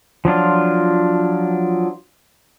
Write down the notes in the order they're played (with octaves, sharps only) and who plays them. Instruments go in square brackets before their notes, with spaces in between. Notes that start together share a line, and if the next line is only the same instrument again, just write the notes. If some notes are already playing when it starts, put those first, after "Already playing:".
[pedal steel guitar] F3 F#3 D4 F4